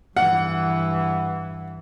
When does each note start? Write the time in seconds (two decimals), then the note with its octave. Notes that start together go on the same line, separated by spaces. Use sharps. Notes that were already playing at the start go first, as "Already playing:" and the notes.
0.17 G2 E3 F#5